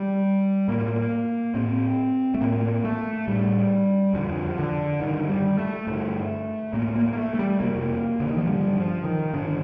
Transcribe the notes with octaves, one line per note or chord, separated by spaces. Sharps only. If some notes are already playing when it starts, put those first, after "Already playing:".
Already playing: G3
A2 A#3
A2 C4
A3
A2 A#3
A3
A2 G3
F2 D3 F3
D3
G2 D3 D#3
G3
A3
G2 D3
A2 A#3
A#3
A#3
A3
A3
G3
F2 C3 A#3
D3
D#3
F3
G2 D3 G3
F3
D#3
G2 D3 D4